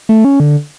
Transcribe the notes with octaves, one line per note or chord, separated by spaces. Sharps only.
A3
C#4
D3